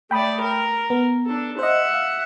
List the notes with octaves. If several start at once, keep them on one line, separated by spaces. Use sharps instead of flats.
A3 D5 G5 B5 D#6
A#4
B3
D4 A4
C5 D#5 E5 F#5
F5